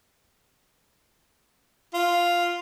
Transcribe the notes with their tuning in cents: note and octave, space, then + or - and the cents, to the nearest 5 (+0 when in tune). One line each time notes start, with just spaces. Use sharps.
F4 +0